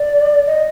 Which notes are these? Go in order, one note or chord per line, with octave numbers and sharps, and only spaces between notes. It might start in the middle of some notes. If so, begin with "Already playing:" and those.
Already playing: D5
D#5